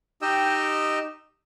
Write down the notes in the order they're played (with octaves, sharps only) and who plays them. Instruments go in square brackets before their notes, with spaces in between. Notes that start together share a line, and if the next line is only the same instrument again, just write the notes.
[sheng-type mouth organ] D#4 G4 D#5 G5 E6